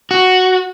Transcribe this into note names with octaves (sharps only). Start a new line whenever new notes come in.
F#4